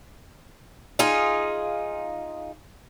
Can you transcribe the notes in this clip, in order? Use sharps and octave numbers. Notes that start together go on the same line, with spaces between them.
D#4 F4 G#4